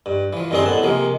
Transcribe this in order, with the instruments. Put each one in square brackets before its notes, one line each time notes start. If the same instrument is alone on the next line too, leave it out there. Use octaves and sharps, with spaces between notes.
[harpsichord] G2
E3 F3
G2 D#3 C4 D4 G#4 C6
A2 B3 A5
C3 F3 G#3 A#3